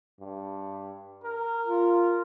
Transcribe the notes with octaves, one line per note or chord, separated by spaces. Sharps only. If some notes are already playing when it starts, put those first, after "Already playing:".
G2
A#4
F4